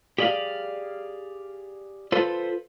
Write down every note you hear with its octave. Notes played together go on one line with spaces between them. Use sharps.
G4 G#4 D5 E5 F5
F4 A4 B4 C5